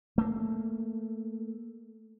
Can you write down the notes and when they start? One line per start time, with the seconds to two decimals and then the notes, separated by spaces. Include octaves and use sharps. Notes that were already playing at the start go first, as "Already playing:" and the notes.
0.18 A3 A#3